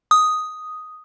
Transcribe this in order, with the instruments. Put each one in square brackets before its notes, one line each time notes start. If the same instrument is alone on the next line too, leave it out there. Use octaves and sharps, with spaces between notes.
[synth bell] D#6